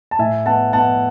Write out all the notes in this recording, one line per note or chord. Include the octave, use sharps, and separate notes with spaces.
A5
A2 E5 G#5
B3 F#5 A5
B3 F#5 A5